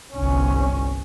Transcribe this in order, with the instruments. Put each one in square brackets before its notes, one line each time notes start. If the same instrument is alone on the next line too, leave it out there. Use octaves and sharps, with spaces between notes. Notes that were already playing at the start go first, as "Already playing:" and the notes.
[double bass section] G1 C2 C#4